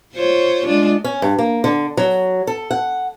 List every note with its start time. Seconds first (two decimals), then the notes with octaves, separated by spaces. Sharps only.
0.14 F4 C5 C#5
0.65 G#3 D4 F4
1.04 C#4
1.22 G2
1.39 A#3
1.64 D3
1.97 F#3
2.47 A4
2.71 F#5